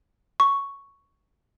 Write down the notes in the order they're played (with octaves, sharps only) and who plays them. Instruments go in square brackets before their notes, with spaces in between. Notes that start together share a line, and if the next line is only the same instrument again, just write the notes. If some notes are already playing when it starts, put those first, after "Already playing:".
[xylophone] C#6